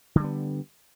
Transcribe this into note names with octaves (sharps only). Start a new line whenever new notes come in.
D3 G3 B3